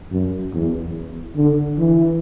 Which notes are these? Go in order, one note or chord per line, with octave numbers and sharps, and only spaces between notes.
F#2
E2
D3
E3